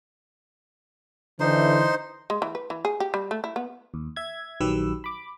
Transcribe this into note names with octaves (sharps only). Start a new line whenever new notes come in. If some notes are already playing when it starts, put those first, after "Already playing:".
D3 E3 D#4 C5 C6
G#3
E3
B4
E3
G#4
G4
G3
A3
E4
B3
D#2
E5 G#6
A#1 D#3 F#3 G4 B4 E6
B5 D6